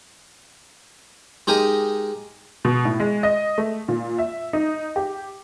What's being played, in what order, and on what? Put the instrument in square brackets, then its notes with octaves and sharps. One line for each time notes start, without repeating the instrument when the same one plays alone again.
[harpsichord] G#3 D#4 G4 A#4 D#6
[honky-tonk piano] B2
A2
G#3
D#5
A3
A#2
E5
D#4
G4